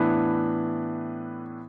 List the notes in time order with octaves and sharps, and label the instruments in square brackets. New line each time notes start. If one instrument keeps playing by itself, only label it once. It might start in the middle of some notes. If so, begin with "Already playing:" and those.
Already playing: [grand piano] A2 E3 B3 D4 B4